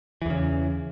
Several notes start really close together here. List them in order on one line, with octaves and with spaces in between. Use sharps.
E3 E2 C#3